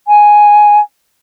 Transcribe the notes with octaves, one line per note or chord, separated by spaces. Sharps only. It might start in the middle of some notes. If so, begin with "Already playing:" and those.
G#5